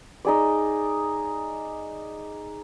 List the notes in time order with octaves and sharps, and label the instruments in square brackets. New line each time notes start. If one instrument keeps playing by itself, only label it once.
[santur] D#4 G#4 D5